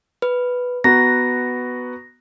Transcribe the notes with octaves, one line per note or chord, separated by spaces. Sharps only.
B4
B3 F#4 A#5 A#6